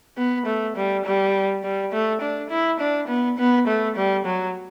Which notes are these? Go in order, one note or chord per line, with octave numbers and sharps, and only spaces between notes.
B3
A3
G3
G3
G3
A3
D4
E4
D4
B3
B3
A3
G3
F#3